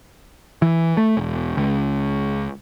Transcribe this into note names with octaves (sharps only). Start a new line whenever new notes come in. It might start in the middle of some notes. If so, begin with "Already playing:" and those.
E3
A3
E1
C#2